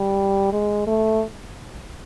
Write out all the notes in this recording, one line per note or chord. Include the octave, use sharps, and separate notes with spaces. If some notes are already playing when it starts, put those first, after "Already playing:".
Already playing: G3
G#3
A3